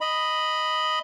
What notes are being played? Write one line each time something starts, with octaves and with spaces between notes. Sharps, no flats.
D#5 B5